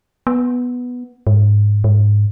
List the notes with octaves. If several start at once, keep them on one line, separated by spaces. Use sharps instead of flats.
B3
G#2
G#2